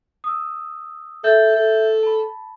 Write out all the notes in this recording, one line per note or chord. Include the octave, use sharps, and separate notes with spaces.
D#6 E6
A4 E5 G6 A6
A4
A5 B5